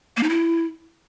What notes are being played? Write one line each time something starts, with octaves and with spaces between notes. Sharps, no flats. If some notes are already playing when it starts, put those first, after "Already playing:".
A#3
D#4
E4